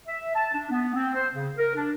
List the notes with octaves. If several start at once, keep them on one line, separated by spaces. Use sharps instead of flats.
E5
A5
D4
B3
C4
C5
C#3
A#4
D4